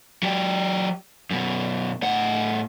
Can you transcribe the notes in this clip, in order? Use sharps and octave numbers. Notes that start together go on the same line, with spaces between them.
F#3 G4
F#2 B2
A2 F#5